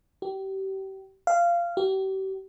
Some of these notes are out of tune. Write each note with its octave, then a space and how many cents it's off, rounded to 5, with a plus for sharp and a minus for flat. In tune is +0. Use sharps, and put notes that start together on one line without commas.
G4 -30
F5 -15
G4 -40